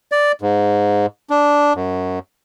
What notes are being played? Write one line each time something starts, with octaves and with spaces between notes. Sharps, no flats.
D5
G#2
D4
F#2